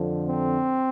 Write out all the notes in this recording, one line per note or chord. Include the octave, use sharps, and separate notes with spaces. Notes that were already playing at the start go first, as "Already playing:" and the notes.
Already playing: F2 D3 F3
C4